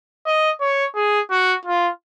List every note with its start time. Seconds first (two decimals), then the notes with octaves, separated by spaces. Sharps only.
0.26 D#5
0.61 C#5
0.95 G#4
1.31 F#4
1.65 F4